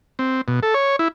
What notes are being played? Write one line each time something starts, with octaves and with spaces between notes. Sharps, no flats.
C4
B2
A4
C#5
E4